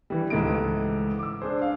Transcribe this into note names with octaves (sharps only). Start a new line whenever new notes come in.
E3 G3
C#2 G#2 E3 A3 D7
D6 E6
D4 G#4 C5
F5